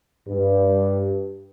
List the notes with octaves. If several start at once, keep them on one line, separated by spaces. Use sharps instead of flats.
G2